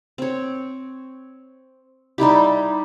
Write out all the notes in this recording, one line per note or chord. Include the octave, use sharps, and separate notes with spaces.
C4 C#5
G3 D#4 E4 G4